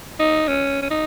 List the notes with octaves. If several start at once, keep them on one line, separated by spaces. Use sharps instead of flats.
D#4
C#4
C#4
D#4